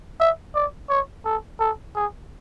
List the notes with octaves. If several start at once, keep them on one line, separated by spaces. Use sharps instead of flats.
E5
D5
C#5
A4
A4
G#4